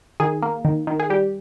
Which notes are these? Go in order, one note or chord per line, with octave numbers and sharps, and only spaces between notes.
D#3 G#4
A#3
D#3
D#3
G#4
G3 G4